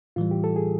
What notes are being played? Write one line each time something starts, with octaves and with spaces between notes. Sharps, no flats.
A2 E3 G3 F4
G4
A4
G#4